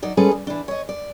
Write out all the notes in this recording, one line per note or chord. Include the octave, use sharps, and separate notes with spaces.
F#3 D#4 D5
G3 G#3 C#4 G#4 A4 B4
G3
E3 D4
C#5 D#5
D5